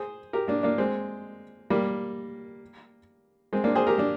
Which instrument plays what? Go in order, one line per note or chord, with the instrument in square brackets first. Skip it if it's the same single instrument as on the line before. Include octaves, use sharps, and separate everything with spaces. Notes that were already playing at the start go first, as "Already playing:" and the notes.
Already playing: [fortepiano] G#4 C5
G4 A#4
A#3 D4
A#3 D4
G#3 C4
G3 A#3
G#3 C4
A#3 D4
G#4 C5
G4 A#4
A#3 D4